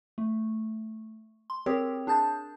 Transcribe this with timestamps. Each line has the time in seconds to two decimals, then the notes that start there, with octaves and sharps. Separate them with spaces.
0.18 A3
1.50 C6
1.66 C4 G4 G#4 A#4 C#5
2.07 D4 G#4 A5 G6 A6